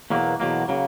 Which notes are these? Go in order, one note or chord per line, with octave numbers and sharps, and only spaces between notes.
E2 B2 F#3 A#3
E2 B2 F#3 A#3
C#3 F#3 A#3